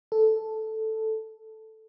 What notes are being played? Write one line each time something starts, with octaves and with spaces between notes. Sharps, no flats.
A4